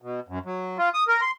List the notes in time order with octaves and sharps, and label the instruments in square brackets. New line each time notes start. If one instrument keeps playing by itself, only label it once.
[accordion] B2
F#2
F#3
F4
D#6
A#4
C6